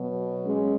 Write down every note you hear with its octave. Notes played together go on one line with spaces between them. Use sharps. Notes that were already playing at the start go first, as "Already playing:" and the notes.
Already playing: B2 F#3
G#3 C#4